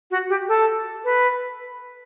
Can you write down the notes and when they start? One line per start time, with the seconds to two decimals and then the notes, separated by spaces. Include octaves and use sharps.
0.11 F#4
0.29 G4
0.48 A4
1.05 B4